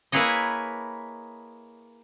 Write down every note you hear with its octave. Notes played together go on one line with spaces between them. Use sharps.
A#3 E4 G#4 B4 C#5 D#5